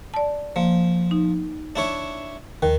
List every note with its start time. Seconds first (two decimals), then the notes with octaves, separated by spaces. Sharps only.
0.14 D5 A5
0.56 F3 A#3
1.11 D#4
1.76 D4 E4 C#5 E5
2.62 D#2 D#3